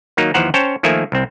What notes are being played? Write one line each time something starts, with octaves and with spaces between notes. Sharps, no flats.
D#3 F#3 A#3 D#4
D#2 E3 F3 C5 F#5 A#5
C#4 C5 C#5 G5 A5
D#3 F3 A3 A#3 E5 G#5
C2 C4